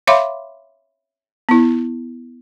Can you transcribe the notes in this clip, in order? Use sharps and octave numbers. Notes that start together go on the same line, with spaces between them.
C#5 E5 F5 B5 C6 D6
B3 E4